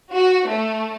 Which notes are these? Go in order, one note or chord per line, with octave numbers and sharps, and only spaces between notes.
F#4
A3